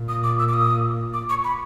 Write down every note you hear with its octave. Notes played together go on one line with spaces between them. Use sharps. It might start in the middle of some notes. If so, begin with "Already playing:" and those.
Already playing: A#2
D#6
D6
E6
D6
D#6
D6
C#6
B5